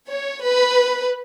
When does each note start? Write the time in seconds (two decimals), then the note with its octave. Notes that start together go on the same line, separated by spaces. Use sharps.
0.08 C#5
0.42 B4